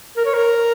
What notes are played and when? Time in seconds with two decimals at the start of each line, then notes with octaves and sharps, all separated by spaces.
0.17 A#4
0.25 C#5
0.34 A#4